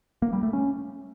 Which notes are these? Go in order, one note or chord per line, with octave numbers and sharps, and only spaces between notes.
A#3
G3
A3
C#4